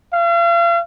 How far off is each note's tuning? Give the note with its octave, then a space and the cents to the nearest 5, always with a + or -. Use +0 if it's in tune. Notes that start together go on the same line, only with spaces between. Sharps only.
F5 -40